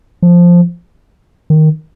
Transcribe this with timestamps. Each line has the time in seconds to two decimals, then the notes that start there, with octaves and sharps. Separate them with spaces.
0.23 F3
1.50 D#3